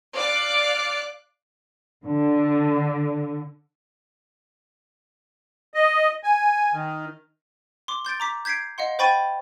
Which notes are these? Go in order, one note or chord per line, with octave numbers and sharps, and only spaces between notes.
D5 F5 D6 F#6 D7
D3
D#5
G#5
D#3
C6 D6
C6 G6 A6 D7
A#5 D6 B6
G6 G#6 B6 C7 D7
D#5 F5 F#5 C6
C5 G5 B5 C#6 A6 D#7